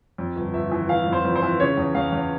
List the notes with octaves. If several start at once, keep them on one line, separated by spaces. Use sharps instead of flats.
F2
G1
G1 E5
E3
E3 F5
F2
C5
F2
C5
E3
C#3 C#5
E2
E2 F5
E2